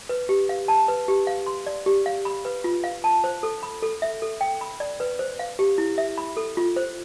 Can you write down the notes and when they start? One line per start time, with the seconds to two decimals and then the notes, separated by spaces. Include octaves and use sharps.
0.09 B4
0.29 G4
0.49 F5
0.68 A5
0.88 B4
1.08 G4
1.27 F5
1.46 C6
1.66 D5
1.86 G4
2.06 F5
2.25 B5
2.45 B4
2.64 F4
2.84 F5
3.04 A5
3.24 C5
3.43 A4
3.63 B5
3.82 A4
4.02 E5
4.22 A4
4.41 G5
4.61 B5
4.80 D5
5.00 B4
5.19 C5
5.39 F5
5.59 G4
5.78 E4
5.98 E5
6.18 B5
6.37 A4
6.57 F4
6.76 C5